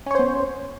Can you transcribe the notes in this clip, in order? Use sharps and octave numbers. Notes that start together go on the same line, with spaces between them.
B3 C#4 C5 C#5